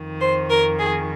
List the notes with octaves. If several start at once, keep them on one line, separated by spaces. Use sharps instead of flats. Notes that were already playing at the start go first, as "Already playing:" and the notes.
Already playing: F2 D#3
C5
A#4
G#4